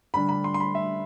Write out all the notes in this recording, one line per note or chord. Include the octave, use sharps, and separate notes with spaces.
D3 G3 D4 B5
B5
C6
C6
B5
E5